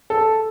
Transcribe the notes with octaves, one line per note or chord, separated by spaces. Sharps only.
A4